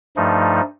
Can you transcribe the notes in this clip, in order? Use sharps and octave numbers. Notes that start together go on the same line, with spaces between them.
G2 F3 A3 D#4